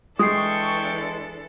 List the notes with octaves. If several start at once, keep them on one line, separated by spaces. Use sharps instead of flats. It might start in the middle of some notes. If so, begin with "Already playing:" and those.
E3 G#3 D4 A4 G5 C#6 D#6 C7